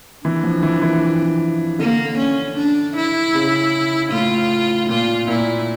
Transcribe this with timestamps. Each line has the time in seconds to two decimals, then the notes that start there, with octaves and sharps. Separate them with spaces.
0.25 E3 D4
0.44 F3
0.63 E3
0.82 E3
1.79 D3 A#3
2.18 C#4
2.57 D4
2.96 E4
3.34 C#3
4.12 A2 F4
4.89 A#2 F4
5.28 A#2 E4